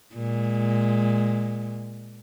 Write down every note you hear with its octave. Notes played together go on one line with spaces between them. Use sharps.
A#2 G#3